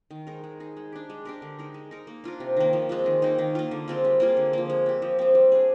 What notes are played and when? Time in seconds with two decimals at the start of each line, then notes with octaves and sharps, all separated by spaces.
0.11 D#3
0.27 G#3 D#4 A#4
0.44 G#3
0.60 D#4 G#4
0.77 G#3
0.92 D4 G4
1.10 G#3
1.25 D4 G4 A#4
1.42 D3
1.59 G#3 D#4 A#4
1.74 G#3
1.91 D#4 A#4
2.07 A#3
2.24 D4 F4 A#4
2.40 C3
2.57 D#3 A#3
2.73 F3
2.89 G#3 C4 F4
3.06 D#3
3.22 A#3 D#4
3.38 D#3
3.55 A#3 F4
3.71 D3
3.88 G#3 C4 F4
4.04 G3
4.20 A#3 F4 G#4
4.37 D3
4.53 F3 A#3
4.70 G#3
4.86 C4 G4
5.02 F3
5.19 G#3 C4
5.35 G3
5.52 D4 G#4